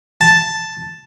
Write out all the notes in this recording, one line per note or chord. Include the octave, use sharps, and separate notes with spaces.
A5